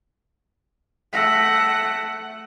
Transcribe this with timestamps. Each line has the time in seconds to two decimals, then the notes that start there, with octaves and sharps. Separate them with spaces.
1.13 A3 F#5 E6 A#6 B6